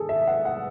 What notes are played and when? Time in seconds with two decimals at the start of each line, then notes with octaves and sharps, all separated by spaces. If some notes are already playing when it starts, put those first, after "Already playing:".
Already playing: G#2 D#3 G#4 A4
0.09 E5
0.27 F#5
0.45 F#5